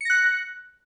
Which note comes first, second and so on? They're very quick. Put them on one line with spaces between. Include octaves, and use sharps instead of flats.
C#7 A#6 F#6